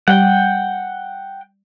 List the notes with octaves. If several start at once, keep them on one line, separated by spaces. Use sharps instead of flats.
G3 F#5 G5